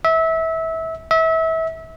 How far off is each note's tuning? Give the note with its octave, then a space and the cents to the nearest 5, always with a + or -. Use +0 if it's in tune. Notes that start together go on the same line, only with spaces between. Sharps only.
E5 -25
E5 -30